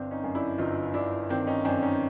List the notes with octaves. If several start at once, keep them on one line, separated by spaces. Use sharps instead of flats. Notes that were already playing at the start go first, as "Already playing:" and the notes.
Already playing: G1 C4 D4
C#4 D#4
F#2
D4 E4
G1 D#4 F4
G1 D4 E4
D#3 C4 D4
C#4 D#4
F#2 C4 D4
D4
C#4 D#4